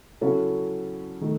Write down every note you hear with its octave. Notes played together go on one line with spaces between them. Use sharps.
C#3 F#3 C#4 E4 A4
D#3 A3